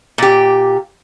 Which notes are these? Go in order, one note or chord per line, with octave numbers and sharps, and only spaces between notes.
A#2 G4